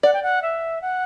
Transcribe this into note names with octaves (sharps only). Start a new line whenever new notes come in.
D5 F#5
G5
F#5
E5
F#5